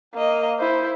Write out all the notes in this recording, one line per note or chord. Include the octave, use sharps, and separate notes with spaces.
A#3 D#5
E4 C5